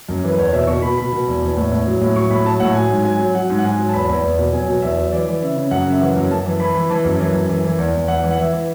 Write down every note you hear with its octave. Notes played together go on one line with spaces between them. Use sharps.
F#2
E3 B4
E2 C#5
B2 E5
B2 C#6
B2 B5
B2 B5
B2
E2
E2
A2
A2
F#3
A2
F#3 C#6
A2 B5
F#3 A5
A2 F#5
F#3 G#5
G#2
F#3 G#5
F#3
F#3 F#5
G#2
F#5
G#2 G#5
F#3
A5
E2 B5
E2
E2
B2
F#3 G#5
B2
E2 E5
F#3
E3 D5
E3
C#3 E5
C#3
F#2 F#5
C#3 E5
E3 F#5
F#2
F#2 A5
E3
E3 B5
E3
E3 A5
F#2
E3
F#2
E3
E3
E2
E2
E3 F#5
E3
F#5
E3 E5
E3